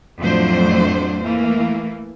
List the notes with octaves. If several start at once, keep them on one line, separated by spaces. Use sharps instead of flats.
F2 A2 F#3 A3 D4 C5
E3 A3 A#3